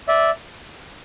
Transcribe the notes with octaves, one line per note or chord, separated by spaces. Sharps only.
D5 E5